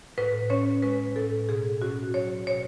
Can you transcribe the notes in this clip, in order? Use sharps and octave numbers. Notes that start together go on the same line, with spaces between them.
A2 B4
C#4 C#5
G#3 B4
A2 A4
B2 G#4
C#4 F#4
F#3 C#5
B2 C#5